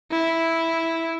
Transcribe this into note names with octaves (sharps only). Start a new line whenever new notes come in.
E4